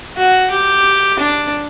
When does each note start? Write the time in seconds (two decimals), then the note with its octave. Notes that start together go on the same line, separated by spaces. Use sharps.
0.17 F#4
0.51 G4
1.19 D4